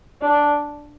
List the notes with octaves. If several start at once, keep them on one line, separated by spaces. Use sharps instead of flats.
D4